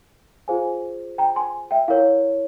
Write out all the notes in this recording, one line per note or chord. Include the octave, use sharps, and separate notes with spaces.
F4 G#4 C5 F5 G#5
G5 A#5
G#5 C6
E5 G5
E4 A#4 C#5 F5